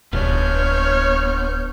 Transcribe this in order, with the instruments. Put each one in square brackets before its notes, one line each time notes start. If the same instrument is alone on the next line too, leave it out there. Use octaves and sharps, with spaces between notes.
[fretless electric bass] D1 [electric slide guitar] B3 D4 [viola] C#5 [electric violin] F6 G6